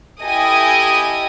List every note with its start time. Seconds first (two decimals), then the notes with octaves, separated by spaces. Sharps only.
0.21 E4 G4 A4 D#5 G#5 D#6